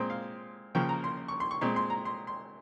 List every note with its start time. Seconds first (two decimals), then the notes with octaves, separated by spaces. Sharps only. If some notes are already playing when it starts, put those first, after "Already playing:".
Already playing: A#2 G#3 C4 C5
0.10 F5
0.75 C#3 F3 A#3 G5
0.89 A#5
1.04 C6
1.28 C#6
1.40 C6
1.51 C#6
1.61 A#2 G#3 C4 C6
1.76 C6
1.90 A#5
2.05 C6
2.27 C6